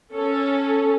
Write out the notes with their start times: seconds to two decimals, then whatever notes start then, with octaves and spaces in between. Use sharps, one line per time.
0.12 C#4 A4